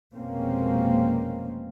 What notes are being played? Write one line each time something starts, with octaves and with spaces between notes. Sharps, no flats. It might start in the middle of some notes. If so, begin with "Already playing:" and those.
F1 B2 G#3 A#3 C4 C#4